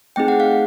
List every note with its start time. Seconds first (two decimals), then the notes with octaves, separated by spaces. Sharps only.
0.16 A3 C4 D#4 G#4 G5
0.28 F#5
0.40 F5